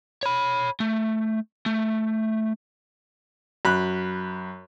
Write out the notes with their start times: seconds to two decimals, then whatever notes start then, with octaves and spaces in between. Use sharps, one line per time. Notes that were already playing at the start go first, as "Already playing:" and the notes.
0.23 C#5 B5
0.80 A3
1.66 A3
3.65 F#2 B5 F#6